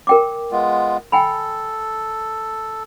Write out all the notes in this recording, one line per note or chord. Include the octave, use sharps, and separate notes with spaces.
A#4 G5 D6
G#3 B3 F4
A4 G5 G#5 B5